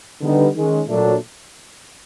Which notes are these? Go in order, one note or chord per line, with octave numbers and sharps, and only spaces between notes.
D3 G3 B3 D#4
D#3 G#3 C#4
A#2 F#3 A3 D4